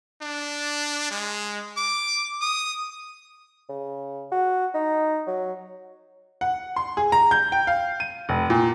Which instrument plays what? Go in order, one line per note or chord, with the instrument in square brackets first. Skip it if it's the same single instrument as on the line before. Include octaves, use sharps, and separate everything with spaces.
[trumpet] D4
G#3
D6
D#6
[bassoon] C#3
F#4
D#4
F#3
[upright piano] F#5
C6
G#4
A#5
G6
G5
F5
D#7
F1
A#2